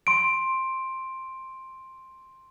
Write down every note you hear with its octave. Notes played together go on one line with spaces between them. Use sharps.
C6 D7